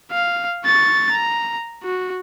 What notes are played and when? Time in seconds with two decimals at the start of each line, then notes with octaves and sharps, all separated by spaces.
0.12 F5
0.65 C#6 A6
1.12 A#5
1.83 F#4